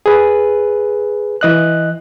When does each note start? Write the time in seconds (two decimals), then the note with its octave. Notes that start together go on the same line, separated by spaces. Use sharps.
0.06 G#4 B4
1.41 E3 D#5 F#6